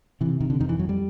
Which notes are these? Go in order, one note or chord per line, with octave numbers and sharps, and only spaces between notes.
C3 E3
C3 D#3
D3
F2 D#3
E3
F2 F#3
G3